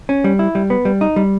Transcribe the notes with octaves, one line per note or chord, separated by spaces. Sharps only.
C#4
G3
E4
G3
B3
G3
D#4
G3